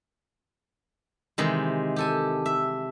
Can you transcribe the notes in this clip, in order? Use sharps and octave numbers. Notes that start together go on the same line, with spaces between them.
C3 D#3 E3 G#3
G4 A4 G#5
E5